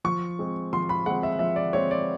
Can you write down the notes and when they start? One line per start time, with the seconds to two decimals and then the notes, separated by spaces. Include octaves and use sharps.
0.04 F3 C#6
0.39 G#3 C4
0.73 F3 C6
0.89 B5
1.06 G#3 F#5
1.10 C4
1.23 E5
1.39 F3 E5
1.56 D5
1.73 G#3 C4 C#5
1.91 D5